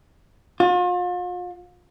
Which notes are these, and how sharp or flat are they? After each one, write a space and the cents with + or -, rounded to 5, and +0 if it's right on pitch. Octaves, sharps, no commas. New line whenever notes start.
F4 +40